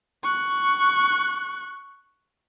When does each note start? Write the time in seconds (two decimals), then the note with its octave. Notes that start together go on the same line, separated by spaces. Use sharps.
0.24 C#6 F#6